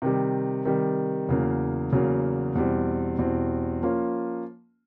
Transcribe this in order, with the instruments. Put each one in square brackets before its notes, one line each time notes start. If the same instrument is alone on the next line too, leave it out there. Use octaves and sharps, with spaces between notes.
[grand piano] C3 D#3 G3
C3 D#3 G3
E2 C#3 F#3 A#3
E2 C#3 F#3 A#3
E2 B2 G3 C4
E2 B2 G3 C4
F3 A#3 C#4 F4